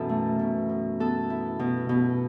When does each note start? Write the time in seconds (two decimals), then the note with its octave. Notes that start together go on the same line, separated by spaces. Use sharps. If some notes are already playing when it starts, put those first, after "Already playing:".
Already playing: F#2 B2 E3 E4 A4
0.09 A3
0.39 B2
0.69 B2
1.00 B3 A4
1.30 E4
1.59 B2
1.89 B2